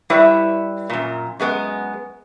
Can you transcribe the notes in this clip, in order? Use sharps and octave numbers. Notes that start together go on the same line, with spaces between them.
G3 E4 B4 C#5 E5
F#2 A#2
F#2 G#3 B3